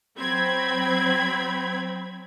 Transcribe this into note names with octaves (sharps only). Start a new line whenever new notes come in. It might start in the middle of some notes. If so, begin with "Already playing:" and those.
F#3 C4 B5 G#6